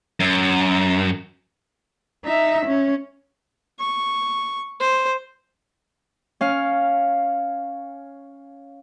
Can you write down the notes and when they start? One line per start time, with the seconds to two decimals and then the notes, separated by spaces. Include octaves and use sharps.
0.20 F#2
2.25 D#4 E5
2.66 C#4
3.80 C#6
4.80 C5
6.41 C#4 F5